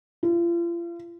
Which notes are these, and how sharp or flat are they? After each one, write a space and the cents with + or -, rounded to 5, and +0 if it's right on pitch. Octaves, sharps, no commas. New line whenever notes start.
F4 -40